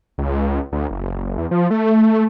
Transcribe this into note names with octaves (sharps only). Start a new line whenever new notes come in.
C#2
D2
F#1
E2
F3
A3